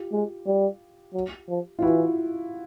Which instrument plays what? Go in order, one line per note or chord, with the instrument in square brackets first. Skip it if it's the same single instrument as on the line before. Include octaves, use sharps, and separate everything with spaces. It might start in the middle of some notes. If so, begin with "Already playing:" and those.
Already playing: [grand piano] F4 G4
[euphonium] G#3
G3
F#3
F3
[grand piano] F4
[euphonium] E3 [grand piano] E4 F#4